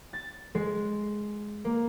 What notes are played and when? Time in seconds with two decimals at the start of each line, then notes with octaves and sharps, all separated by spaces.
0.13 A6
0.55 G#3
1.65 A#3